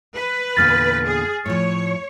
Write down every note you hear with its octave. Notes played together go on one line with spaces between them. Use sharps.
B4
E2 A#2 D3 F6 A6
G#4
A2 F3 C#5